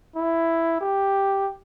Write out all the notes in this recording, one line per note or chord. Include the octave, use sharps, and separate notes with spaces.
E4
G4